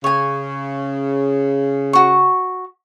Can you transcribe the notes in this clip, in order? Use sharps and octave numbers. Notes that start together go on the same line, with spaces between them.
C#3 C#5 G#5
F#4 C#6